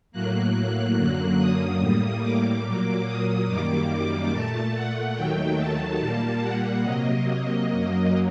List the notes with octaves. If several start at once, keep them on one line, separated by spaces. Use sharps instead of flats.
A2 F#3 A#3 F#6
F#2 D3 F#3 A#3
D#6
A2 G3 A#3
D6
A#2 F#3 A#3
D#6
F#2 D#3 G3 A#3 D6
A#2 A3 A5
F#5
D#2 D#3 F#3 A3 G5
A5
A#2 G3 A#3
F#5
C3 F#3 A#3 D#5
F#2 F#3 A#3